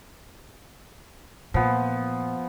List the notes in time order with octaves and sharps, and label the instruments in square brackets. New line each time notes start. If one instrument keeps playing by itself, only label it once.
[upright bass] A#2 [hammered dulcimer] F3 B3